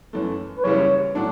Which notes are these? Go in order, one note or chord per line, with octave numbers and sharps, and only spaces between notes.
F#2 E3 A3
B4
F#1 F#2 C#3 E3 G3 C#5
A2 F#3 A3 D4